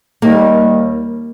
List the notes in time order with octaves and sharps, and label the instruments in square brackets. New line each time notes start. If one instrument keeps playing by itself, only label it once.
[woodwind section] D#2 D#3 G3 [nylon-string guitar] A#3